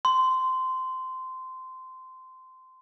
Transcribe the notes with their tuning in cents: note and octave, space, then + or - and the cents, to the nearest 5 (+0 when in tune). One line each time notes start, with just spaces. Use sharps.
C6 -15